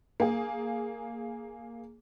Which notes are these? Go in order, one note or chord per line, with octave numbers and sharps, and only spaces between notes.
A#3 G#4